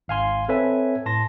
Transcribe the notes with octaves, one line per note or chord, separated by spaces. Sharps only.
G#1 F5 G#5 C6
C4 A4 B4 C#5 E5 G#5
A2 A5 C6 A#6